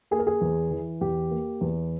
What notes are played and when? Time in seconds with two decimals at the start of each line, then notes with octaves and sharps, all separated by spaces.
0.11 A#3 G#4
0.19 A#4
0.27 G#4
0.41 E2
0.71 E3
1.01 E2 G4
1.31 A#3
1.61 E2